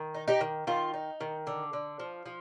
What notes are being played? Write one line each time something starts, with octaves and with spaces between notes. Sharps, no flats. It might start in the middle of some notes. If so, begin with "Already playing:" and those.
Already playing: D#3
D#4
D#4 G4
D#3
D#3 F4
D#4
D#3
D3
D3
F3
F3